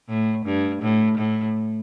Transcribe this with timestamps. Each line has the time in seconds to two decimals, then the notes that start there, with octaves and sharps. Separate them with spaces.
0.08 A2
0.45 G2
0.82 A2
1.18 A2